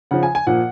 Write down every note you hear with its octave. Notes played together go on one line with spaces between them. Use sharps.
C#3 F3 F#5
G#5
G#5
A#2 F3 F#5